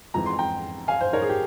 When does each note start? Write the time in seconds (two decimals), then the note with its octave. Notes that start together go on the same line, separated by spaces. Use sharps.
0.14 F2 E3 G#3 A#5
0.26 C6
0.39 G5 A#5
0.88 F5 G#5
1.01 C5
1.13 A#4 C#5
1.22 G#4
1.29 G4